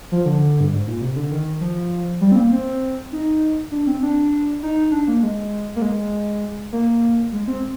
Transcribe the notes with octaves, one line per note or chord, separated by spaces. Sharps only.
F3
D3
G2
G#2
A#2
C3
D3
D#3
F3
G3
C4
A#3
C4
D#4
D4
C4
D4
D#4
D4
A#3
G#3
A#3
G#3
A#3
G#3
C4